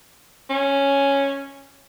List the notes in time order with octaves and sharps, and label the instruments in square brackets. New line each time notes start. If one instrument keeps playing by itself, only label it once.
[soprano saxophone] C#4